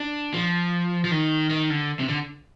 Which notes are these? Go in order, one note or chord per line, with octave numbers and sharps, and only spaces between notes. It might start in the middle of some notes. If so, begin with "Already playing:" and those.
Already playing: D4
F3
F3
D#3
D#3
D3
C3
D3